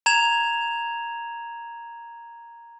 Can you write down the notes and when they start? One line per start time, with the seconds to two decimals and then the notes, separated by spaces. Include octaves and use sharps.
0.06 A#5 G#6 E7 F7